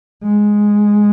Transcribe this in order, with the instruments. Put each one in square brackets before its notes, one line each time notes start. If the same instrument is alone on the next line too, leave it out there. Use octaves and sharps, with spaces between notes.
[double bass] G#3